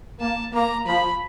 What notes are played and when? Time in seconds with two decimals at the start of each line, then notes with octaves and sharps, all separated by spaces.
0.20 A#3 A5
0.53 A#3 A#5
0.86 F3 B5